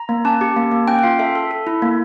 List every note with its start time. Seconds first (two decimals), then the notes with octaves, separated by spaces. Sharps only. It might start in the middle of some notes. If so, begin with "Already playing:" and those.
Already playing: A#5
0.09 A#3
0.25 C#4 A5
0.41 G4
0.56 A#3
0.72 A#3
0.88 C#4 G5
0.99 G5
1.03 F4 F5
1.19 A4 E5
1.35 A4
1.51 A4
1.67 E4
1.82 A#3